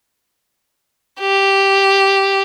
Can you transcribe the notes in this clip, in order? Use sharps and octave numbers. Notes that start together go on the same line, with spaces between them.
G4